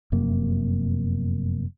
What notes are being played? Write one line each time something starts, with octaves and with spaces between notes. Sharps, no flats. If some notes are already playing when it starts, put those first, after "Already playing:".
F1 F#2 C3 A#3